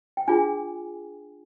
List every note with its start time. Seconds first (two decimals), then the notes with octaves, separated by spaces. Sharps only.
0.17 G5
0.28 D4 F4 G#4 G#5